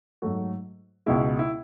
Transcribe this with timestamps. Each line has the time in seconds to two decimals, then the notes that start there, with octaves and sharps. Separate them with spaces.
0.22 G#2 F#3 A3 F#4
1.06 C#2 B2 G#3 E4
1.39 E4